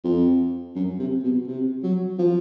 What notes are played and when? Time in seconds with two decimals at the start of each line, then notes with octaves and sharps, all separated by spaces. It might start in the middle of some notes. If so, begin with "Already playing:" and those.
0.04 F2
0.76 F#2
1.00 C3
1.24 B2
1.47 C3
1.84 F#3
2.19 F3